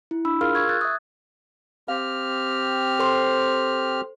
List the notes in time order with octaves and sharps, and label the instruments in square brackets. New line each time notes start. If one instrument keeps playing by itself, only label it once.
[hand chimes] E4
D4 B5 E6
F4 G#4 A#4 F5 C6 F6
C#6 E6 G#6
F#6 G#6 A6
E5 D#6
[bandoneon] C4 G4 F6 [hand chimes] F5
[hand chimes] A4 C5 C6